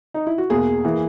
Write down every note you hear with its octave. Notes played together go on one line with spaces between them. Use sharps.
D#4
E4
F#4
E2 B2 A#3 G#4
E3 A#3